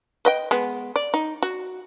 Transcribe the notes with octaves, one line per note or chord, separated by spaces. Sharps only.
B4 D#5 G5
G#3 B3
D5
D#4
F#4